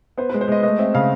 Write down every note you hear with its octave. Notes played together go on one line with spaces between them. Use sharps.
B3 C5
G#3 B4
C5
G#3 D#5
A3 D#5
C4 E5
C#3 F5